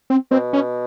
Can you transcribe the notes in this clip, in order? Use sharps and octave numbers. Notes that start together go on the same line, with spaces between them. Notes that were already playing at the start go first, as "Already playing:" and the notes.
C4
B2 C4
C#4